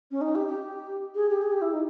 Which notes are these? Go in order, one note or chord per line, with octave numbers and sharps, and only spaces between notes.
C#4
D#4
G4
G4
G#4
G4
G#4
G4
E4
D#4